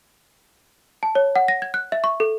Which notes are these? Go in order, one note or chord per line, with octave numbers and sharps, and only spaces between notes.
A5
C#5
F#5
A#6
G#6
F#6
E5
C#6
A4